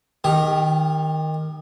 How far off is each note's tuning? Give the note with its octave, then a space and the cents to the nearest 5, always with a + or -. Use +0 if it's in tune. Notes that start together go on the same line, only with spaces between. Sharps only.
D#3 -5 G4 +30